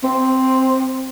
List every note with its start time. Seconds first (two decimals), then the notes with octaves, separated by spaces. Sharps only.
0.04 C4